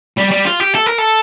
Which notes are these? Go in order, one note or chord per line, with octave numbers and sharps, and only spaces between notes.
G3
G3
F4
G4
A4
A#4
A4